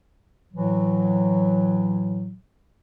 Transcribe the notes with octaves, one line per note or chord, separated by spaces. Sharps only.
A2 E3 F#3